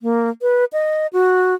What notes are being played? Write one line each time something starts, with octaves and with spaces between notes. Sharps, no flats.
A#3
B4
D#5
F#4